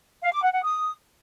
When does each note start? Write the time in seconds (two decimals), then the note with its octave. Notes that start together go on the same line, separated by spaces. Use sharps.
0.23 F5
0.33 D6
0.43 F#5
0.53 F#5
0.63 D#6